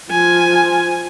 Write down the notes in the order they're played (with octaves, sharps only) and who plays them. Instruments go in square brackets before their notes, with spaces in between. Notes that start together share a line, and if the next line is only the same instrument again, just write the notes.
[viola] F3 [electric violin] G#5